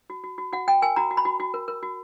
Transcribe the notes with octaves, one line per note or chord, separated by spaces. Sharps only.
F#4
F#4
F#4
F#4 F#5
F#4 G5
A#4 G#5
F#4 A#5
F#4
B5
F#4
F#4
A#4
A#4
F#4